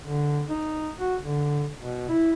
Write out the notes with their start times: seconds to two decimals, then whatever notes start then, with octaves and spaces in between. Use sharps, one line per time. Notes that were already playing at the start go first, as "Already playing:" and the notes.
0.02 D3
0.49 D#4
0.99 F#4
1.21 D3
1.81 B2
2.09 E4